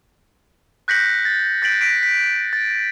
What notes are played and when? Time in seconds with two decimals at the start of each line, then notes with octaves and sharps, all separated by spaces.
0.88 F#6 G6 A#6 B6 C#7 F#7
1.25 A6
1.62 G6 A6 B6 D7 F#7
1.81 A#6 B6 D7
2.03 B6
2.53 A6